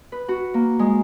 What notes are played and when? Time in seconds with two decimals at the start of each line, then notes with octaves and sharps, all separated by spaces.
0.12 B4
0.28 F#4
0.54 A#3
0.79 G#3